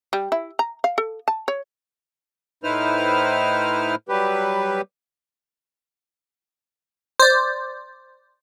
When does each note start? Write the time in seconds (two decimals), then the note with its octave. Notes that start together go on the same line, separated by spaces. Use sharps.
0.13 G3
0.32 E4
0.59 A#5
0.84 F5
0.98 A4
1.28 A5
1.48 C#5
2.63 A2 D#4 E4 B4 C5 F6
4.09 F#3 G3 G4 B4
7.20 C5 D5